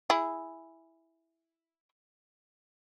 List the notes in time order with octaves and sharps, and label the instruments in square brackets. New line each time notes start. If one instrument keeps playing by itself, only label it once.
[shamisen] E4 G#4